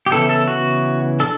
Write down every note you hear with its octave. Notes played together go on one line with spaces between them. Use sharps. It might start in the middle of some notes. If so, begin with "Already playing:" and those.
G4
C#3 E3 B3 E4 A4
A4
F#4
D4 A4